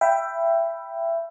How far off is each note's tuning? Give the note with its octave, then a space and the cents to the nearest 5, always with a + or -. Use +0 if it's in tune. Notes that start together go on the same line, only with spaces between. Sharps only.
E5 +20 G5 +0 B5 +0